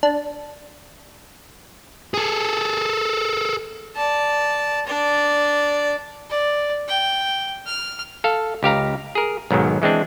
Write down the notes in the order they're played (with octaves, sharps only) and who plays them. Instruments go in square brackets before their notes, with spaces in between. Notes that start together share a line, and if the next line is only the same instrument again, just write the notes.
[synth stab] D4
[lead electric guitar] G#4 A4
[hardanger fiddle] D5 A5
D4 D5
[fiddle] D5
G5
F6
[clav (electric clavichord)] A4 F5
C#2 G4 F5 A#5
G#4 A#4
B1 G#2 D#3 F#3
E3 G#3 C4 D4